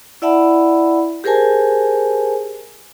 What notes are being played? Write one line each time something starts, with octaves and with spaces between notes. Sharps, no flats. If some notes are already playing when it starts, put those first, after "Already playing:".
E4 D5 E5 F#5 A5 B5
G4 G#4 A#4 C5 G#5 A5